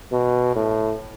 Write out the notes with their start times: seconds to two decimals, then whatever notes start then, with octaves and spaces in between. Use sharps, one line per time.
0.12 B2
0.55 A2